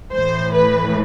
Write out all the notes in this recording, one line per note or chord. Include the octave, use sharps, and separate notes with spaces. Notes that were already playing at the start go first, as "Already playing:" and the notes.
A2 E3 C5
B4